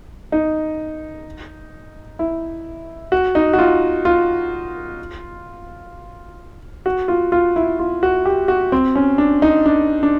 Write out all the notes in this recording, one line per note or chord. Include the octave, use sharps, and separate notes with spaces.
D#4
E4
F#4
D#4
F#4
F4
F4
F#4
F4
F4
E4
F4
F#4
G4
F#4
C4
C#4
D4
D#4
D4
D4